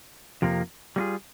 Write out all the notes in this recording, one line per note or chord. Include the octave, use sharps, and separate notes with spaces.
F2 C3 F3 A#3
G3 A#3 C#4 F4 G#4